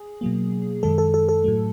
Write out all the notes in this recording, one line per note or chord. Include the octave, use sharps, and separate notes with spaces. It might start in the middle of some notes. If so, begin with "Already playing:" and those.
Already playing: G#4
B2 F#3 A#3
F#2 D#3 G#3 A4
A4
A4
A4
A2 F#3 A3